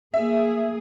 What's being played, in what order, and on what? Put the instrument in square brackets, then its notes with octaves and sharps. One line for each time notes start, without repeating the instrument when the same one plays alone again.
[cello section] A#3 G#4 [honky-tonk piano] E5